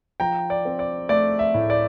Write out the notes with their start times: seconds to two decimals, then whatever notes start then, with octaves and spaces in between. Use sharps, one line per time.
0.20 F3 G5 A#5
0.50 D5
0.65 C4
0.79 D5
1.09 A3 D5
1.39 E5
1.54 A2
1.70 D5